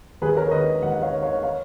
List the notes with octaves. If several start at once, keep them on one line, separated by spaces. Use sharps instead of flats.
D#2 G#4 B4
A#4 C#5
D#3 B4 D#5
D#2 D#5 F#5
F#5
C#5 F5
D#3
C#5 F5
C#5 F5